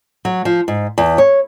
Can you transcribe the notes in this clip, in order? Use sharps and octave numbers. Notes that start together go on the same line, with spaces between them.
F#3
F3
G#2
E2
C#5